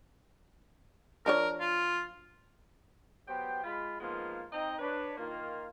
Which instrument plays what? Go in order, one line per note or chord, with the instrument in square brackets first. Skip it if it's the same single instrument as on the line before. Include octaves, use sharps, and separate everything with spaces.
[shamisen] F3 D4 C#5 [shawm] A#4
[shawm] F4
[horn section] F#3 B3 G4 C5 G5
G#3 F4 B5
D#3 F3 G#3 A#3 B3 F4
C4 D#4 D#5 G5 A#5
D4 B4 C#5
D#3 A#3 F4